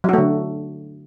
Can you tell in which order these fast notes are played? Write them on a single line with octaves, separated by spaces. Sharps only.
F#3 F#4 A3 D3